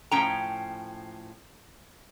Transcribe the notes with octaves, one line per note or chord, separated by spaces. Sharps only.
A2 F3 C#4 G5 A#5